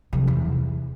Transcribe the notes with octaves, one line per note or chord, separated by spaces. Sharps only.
C3 F3
E2